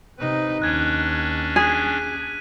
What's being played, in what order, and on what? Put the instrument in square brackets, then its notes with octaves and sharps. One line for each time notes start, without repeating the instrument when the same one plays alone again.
[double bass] C3 D#4 [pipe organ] B4
[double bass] D#2 [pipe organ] C#4 D4 [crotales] F#6 G#6
[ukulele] G#4 [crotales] F#6 B6 D#7